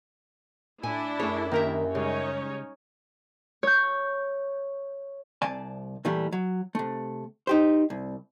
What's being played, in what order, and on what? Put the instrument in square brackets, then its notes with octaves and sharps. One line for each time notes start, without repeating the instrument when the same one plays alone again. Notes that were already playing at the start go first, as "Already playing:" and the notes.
[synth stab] A2 [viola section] D4 E4 [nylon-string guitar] G#5
[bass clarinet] F#2 [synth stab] A3 C#4 G#4 [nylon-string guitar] C#5
[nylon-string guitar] D#3 A#4 E5 [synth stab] A#3 G4
[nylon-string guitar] C#3 [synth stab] G3 G#3 [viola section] C#4 D#4 C#5
[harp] C#5 G6
[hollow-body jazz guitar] C2 C3 D5 G#5 A5
A#2 E3 G3 A3
F#3
C3 A3
D#4 G4 C5
C2